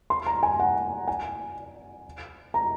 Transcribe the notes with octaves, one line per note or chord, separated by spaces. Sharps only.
C6
A#5
G#5
F#5
G#5
A#5